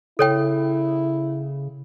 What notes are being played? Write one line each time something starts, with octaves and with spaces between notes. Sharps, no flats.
C#3 E4 A4 C#5 G5